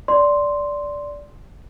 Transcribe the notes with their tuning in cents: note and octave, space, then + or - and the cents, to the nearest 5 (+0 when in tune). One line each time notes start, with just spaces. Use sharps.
D5 -10 C6 +0